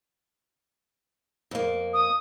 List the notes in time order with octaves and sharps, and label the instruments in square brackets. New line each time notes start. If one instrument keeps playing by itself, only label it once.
[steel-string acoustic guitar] F2 A#3
[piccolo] D#6